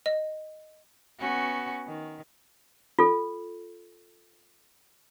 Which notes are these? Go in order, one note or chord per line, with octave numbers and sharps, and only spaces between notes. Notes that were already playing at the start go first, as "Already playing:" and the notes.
D#5
B3 C#4 F#4
D#3
F4 A4